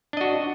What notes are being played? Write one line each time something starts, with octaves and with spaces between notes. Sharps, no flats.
D4 F#4 D#5